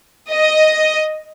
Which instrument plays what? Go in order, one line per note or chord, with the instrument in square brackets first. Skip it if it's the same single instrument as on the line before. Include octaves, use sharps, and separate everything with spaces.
[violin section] D#5